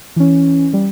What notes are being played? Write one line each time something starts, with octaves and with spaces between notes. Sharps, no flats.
E3 C#4
G3